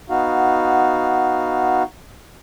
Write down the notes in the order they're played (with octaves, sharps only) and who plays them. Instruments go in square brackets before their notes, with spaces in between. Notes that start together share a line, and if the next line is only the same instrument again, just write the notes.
[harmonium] B3 D#4 F#4 F5